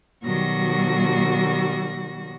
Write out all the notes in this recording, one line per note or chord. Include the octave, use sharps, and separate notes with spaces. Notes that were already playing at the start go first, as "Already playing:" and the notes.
B2 D#3 F#3 G3 F#4 A#6